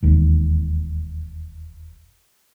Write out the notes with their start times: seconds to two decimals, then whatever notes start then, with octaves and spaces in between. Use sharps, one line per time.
0.02 E1 D#2